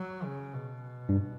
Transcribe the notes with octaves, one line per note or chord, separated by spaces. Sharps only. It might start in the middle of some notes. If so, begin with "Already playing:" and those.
Already playing: F#3
C#3
B2
G2